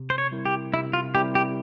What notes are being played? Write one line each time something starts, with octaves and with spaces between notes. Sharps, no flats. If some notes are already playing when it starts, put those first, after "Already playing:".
Already playing: C3
C5
C#5
G3 C4 E4 A#4
G4
C3 E4
F4
G3 C4 E4 G4 A#4
G4